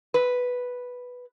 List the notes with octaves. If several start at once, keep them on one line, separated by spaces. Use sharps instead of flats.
B4